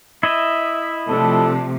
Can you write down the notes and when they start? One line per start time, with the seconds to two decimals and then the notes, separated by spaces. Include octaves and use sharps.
0.23 E4 D#5 E5
1.09 C3 F3 A3 D4 A4